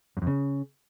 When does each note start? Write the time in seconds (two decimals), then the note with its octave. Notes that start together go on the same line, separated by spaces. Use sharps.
0.17 F#2
0.22 F2
0.27 C#3